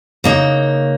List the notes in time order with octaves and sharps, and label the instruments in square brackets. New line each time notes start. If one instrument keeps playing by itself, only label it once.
[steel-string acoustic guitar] C#3 A#3 D#4